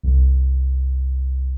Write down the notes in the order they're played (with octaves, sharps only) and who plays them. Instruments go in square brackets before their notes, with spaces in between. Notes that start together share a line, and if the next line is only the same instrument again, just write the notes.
[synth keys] C2